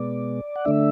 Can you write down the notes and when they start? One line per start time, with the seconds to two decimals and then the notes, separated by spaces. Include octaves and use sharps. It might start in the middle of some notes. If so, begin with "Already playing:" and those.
Already playing: B2 G#3 B3 D5
0.56 F#5
0.65 D3 A3 D4 E5